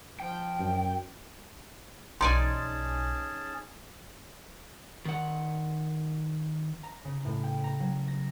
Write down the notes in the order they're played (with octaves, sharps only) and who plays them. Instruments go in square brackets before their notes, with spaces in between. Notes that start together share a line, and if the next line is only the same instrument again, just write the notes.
[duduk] F3 [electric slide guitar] G5
[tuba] F#2
[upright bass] B1 [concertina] C#4 G#4 A5 [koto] D#4 D5 G#5 [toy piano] C6
[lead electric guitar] D#3 F#5
[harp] A#5
C#3
A2
G5
A#5
F#3
A#6